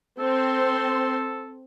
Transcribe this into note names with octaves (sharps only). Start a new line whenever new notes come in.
C4 A4 C6